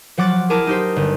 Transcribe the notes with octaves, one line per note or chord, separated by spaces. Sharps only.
F3 F#3 F#5 D6 A6
E4 G#4 A#4 A5 D6
D#4 G4 C5
G1